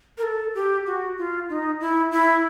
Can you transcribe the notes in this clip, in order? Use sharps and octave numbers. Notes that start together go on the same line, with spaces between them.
A#4
A4
G4
F#4
F4
D#4
E4
E4